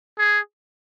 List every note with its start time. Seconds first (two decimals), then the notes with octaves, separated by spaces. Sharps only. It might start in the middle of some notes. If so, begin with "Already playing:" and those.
0.19 G#4